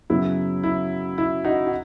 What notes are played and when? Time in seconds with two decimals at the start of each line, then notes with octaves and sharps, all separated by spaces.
0.10 F#2 C#3 F#3 B3 E4
0.63 E4
1.18 E4
1.44 D#4 F#4
1.67 F#4